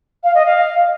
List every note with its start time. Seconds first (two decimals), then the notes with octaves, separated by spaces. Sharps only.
0.23 F5
0.35 D#5
0.46 F5